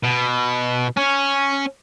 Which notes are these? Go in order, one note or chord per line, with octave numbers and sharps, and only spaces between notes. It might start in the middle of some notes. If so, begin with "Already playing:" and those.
B2
C#4